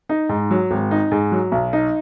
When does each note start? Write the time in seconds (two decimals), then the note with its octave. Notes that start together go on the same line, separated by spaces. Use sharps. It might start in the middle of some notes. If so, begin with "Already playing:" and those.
0.09 D#4
0.29 G#2
0.51 F#3
0.71 G#1
0.91 D#4
1.12 G#2
1.32 F#3
1.52 B1
1.73 D#4